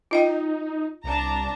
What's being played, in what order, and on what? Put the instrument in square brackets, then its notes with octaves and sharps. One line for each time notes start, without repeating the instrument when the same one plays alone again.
[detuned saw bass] D#4 [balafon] F4 D#5 G5
[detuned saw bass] C2 [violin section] D4 A5 A#5